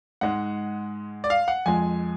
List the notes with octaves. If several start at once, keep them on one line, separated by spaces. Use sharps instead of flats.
G#2 G#3 F#5
D5
F5
F#5
F2 F3 G#3 G#5